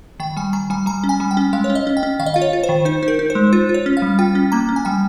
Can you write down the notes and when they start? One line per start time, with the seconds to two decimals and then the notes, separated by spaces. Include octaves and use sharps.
0.20 D#3 G5
0.37 G3 G#5
0.53 D#3 A#5
0.70 G3 G#5
0.86 G3 A#5
1.04 C#4
1.09 G#5
1.20 G3
1.31 G5
1.37 C#4
1.53 G#3 F5
1.64 C#5
1.70 C#4
1.75 D#5
1.87 C#4
1.97 G5
2.03 C#4
2.20 D#3 F5
2.26 D#5
2.34 F4 F5
2.42 C#5
2.53 F4
2.64 C5
2.69 D#3
2.85 D#4 C5
3.03 D#4
3.08 A#4
3.19 D#4
3.30 C5
3.35 G#3
3.53 F4 C5
3.69 F4
3.74 C#5
3.86 C#4
3.97 F5
4.02 G3
4.19 F4 G5
4.35 C#4
4.52 A#3 A#5
4.69 C#4
4.76 G#5
4.85 G3 G5